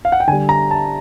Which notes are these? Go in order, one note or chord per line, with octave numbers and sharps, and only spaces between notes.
F5
F#5
G5
D3 G3 G#5
A#5
A5